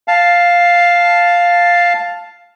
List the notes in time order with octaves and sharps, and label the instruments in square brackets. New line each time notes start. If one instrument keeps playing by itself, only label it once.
[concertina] F5 A5